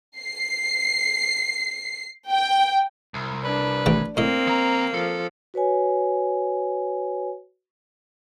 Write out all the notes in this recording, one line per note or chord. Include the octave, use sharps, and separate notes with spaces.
C7
G5
C2
D4 B4
A1 E3 G5
A2 A#3 C4 D#5
F3 A#5
F3 A4
F#4 B4 C#5 G#5